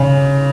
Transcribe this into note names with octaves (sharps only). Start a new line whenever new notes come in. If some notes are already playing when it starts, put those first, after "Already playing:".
Already playing: C#3